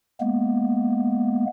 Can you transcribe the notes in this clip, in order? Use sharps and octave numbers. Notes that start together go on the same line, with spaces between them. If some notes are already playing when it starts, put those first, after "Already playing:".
G#3 A#3 B3